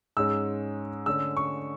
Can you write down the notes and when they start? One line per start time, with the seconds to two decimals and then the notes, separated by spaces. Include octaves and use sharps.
0.17 G#2 G#3 C#4 E6
1.06 D3 A3 C#4 E6
1.37 C#6